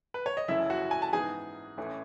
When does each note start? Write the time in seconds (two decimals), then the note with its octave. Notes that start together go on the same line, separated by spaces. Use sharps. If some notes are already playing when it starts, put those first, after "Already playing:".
0.14 B4
0.26 C#5
0.37 D#5
0.48 F#1 F#2 E3 A3 C#4 E4 E5
0.70 F#4 F#5
0.91 G#5
1.02 A5
1.13 G#2 E3 B3 D#4 G#4 G#5
1.78 A1 A2 E3 A3 C#4